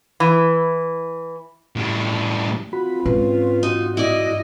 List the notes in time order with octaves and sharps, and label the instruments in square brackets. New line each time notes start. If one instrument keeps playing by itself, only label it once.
[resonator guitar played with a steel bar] E3
[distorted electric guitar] A2 G3
[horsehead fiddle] C4 F4 [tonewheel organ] F#4 B5
[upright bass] G#2 [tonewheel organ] C#4 B4
[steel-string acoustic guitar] D#4 [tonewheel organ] F#4
[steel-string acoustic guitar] E4 D5 [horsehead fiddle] D#5